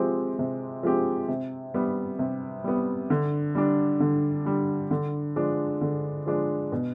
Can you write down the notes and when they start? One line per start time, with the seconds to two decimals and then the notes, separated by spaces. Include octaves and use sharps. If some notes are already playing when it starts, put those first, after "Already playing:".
Already playing: C3 F3 G#3 C4 G4
0.39 C3
0.83 F3 G#3 C4 G4
1.28 C3
1.74 G3 B3
2.19 C3
2.64 G3 B3
3.10 D3
3.55 G3 D4
4.00 D3
4.45 G3 D4
4.91 D3
5.36 F3 G#3 D4
5.81 D3
6.26 F3 G#3 D4
6.72 B2